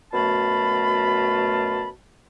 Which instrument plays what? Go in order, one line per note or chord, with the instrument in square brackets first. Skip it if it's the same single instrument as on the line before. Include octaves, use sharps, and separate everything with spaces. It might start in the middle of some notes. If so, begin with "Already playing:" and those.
[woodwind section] F#2 B2 A3 F4 A5 B5